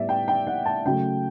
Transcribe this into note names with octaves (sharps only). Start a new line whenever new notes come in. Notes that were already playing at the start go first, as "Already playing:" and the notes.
Already playing: A2 G3 B3 D5 E5
G5
G5
F#5
A5
C#3 F#3 A3 G5